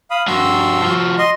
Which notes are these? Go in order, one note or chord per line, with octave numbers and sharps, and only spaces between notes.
F5 B5 D#6
G2 F#4 C6 E6
F3 F#4
D#5 C6